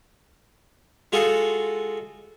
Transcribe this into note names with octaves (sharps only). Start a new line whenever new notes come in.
G#3 F4 F#4 G#4 A4